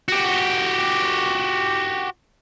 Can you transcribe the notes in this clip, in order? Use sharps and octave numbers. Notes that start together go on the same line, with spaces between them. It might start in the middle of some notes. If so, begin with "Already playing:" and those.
F#4 G4